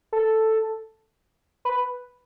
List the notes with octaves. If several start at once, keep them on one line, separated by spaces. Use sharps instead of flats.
A4
B4